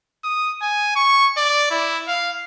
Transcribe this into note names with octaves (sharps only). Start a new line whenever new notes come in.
D#6
G#5
C#6
D5
E4
F5